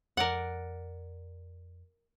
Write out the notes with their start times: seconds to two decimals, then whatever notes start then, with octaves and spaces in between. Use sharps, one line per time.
0.17 F2 A#4 D5 F#5